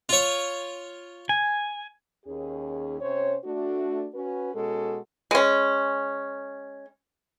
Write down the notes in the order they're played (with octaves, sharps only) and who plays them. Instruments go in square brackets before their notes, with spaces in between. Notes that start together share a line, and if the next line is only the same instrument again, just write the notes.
[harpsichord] F4 C#5
[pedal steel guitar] G#5
[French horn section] D#2 C#4 G#4
C3 C#4 C5 C#5
A3 D4 F#4
C#4 F#4 B4
B2 G#3 C#4 F#4 A4
[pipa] G#3 C#4